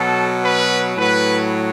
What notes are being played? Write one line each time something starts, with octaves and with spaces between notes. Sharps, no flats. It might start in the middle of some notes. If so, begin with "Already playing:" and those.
Already playing: B2 F#3 A4
B4
A2 F#3 B4